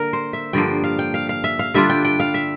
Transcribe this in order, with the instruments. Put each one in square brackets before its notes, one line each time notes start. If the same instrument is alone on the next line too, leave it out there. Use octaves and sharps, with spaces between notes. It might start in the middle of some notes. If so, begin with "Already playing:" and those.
Already playing: [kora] D3 A#3 A#4
C5
E5
G2 D3 F3 A#3 G5
F5
G5
F5
F5
E5
F5
D3 G3 D4 F4 E5
G5
G5
F5
E5